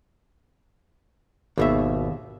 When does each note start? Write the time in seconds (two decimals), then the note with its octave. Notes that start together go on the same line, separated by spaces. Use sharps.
1.58 G#1 D#2 B2 E5